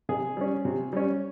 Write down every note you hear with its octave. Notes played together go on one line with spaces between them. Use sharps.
C3 G#4
G3 C#4
C3
G3 C#4